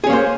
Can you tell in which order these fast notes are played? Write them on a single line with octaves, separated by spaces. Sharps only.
G#4 C#4 A#3 C5